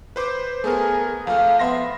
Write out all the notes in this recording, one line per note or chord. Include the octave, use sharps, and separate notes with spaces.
B4 C5 D6
A3 B3 G#4 A#4
F2 A3 F5
B3 E5 C6 A#6